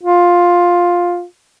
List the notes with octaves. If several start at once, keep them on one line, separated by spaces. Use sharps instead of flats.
F4